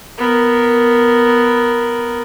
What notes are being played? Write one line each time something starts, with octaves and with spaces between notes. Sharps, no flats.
B3 A#4